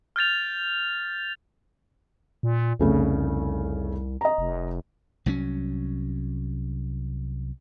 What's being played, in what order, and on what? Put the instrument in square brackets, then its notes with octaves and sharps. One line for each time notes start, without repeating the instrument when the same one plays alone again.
[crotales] F6 G6 A6 F7
[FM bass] A#2
[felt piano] F1 C#3 A3 [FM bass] C2
[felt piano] D#5 A#5
[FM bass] F1
[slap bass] C2 F#3 G3 C#4